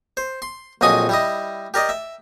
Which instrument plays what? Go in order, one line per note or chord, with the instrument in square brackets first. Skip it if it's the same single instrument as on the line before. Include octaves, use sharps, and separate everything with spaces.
[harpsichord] C5
C6
A#1 F2 F#3 D#5 G#5 D#6
G3 E4 D#5
G4 A#4 D5 D#5
E5